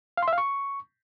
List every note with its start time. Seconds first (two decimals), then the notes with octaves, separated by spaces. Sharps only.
0.17 F5
0.23 C6
0.28 E5
0.33 F5
0.38 C#6